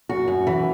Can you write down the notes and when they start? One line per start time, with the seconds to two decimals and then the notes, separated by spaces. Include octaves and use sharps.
0.09 F#2 F#4
0.28 F#2
0.47 E3